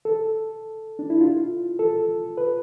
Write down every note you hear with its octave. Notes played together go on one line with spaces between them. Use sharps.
A4
D4
E4
F4
A4
B4